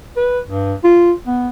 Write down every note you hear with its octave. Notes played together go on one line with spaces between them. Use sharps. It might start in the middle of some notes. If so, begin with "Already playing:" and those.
B4
G2
F4
B3